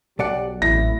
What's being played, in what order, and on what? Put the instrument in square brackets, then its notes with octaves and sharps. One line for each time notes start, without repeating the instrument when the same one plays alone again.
[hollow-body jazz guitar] B1 D5 F#5 [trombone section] F#3 G3 G4
[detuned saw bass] A1 [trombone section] E4 [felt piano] A#6